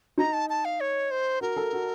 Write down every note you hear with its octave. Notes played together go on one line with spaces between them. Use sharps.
D#4 A#5
A5
A5
F5
C#5
C5
F#4 A#4
A4
F#4